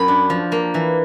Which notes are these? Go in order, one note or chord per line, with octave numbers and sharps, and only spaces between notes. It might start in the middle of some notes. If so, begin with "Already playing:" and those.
Already playing: F#2 B5
D4
F3
A#3
E3